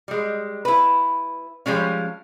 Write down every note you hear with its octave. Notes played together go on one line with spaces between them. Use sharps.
G3 G#3
E4 B4
F3 G3 G#3 C#4